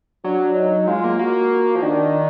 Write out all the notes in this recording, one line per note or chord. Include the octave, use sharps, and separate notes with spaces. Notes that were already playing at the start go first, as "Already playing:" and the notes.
F#3 D4
D#4
G#3 F4
A#3
A#3 F#4
F3
D#3 D4